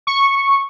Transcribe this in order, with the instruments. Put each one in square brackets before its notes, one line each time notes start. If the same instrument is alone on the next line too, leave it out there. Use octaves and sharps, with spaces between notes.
[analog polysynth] C#6